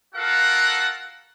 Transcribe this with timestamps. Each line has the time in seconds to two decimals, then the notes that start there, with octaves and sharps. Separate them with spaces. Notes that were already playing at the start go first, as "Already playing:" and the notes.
0.15 F4 F#4 A4 A#4 F5 F#5